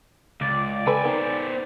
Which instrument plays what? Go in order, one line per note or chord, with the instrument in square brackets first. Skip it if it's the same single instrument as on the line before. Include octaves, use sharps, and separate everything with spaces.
[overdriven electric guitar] C#2 [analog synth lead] D5
[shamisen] A4 B4 [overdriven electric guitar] G5 G#5
[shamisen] D#3 [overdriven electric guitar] B3 C5